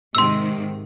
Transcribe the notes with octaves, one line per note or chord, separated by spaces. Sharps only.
G#2 C3 D#3 C6 E6